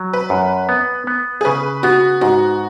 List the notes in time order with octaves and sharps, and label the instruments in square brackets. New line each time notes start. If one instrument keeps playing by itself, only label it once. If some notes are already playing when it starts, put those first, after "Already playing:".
Already playing: [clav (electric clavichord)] F#3
[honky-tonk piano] B4
[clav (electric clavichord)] F#2
B3
B3
[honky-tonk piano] G#4
[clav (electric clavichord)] C#3 [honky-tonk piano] B4
[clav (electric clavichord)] B3 [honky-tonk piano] F#4
[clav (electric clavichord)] G#2 [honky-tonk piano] F#4